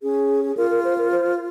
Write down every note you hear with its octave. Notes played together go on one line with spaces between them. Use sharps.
C#4 G#4
G#4
F4 A#4
A#4
C5
A#4
C5